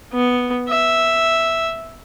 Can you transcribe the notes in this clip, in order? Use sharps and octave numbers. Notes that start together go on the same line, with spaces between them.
B3
E5